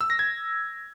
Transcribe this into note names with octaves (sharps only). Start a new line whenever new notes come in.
E6
A#6
G#6